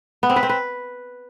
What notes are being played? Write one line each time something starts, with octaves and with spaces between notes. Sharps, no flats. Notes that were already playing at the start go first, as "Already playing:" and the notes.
B3
C4
B4
C4
B4